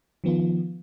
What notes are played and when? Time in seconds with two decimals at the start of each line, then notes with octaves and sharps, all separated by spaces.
0.24 D#3 F3 B3 F4